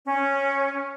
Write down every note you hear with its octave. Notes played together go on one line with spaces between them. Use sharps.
C#4